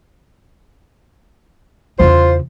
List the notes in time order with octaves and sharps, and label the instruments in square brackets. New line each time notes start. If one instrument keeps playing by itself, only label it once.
[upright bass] E2 C#3 [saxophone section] F4 C5